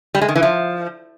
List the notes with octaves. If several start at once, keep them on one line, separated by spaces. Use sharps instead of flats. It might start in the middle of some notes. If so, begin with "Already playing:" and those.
G3
G#3
D#3
E3
F3